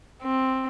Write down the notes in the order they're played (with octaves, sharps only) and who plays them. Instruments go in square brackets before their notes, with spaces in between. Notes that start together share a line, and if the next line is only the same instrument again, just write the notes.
[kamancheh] C4